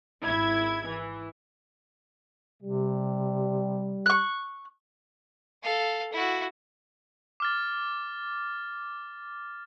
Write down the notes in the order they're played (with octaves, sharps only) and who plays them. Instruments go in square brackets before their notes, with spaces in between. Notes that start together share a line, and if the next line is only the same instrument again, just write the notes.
[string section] G#1 E4 G#6
E3
[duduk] C3 [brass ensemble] G3
[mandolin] C#6 F#6
[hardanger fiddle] A4 F5
E4 F#4
[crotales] D6 F6 A6